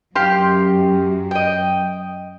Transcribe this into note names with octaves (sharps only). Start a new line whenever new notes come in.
F#2 G4 F5 C6
D#5 G5